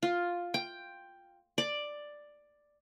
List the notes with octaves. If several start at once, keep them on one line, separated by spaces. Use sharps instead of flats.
F4
G5
D5